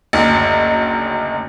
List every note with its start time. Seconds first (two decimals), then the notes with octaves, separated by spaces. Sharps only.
0.13 F#1 D2 D#4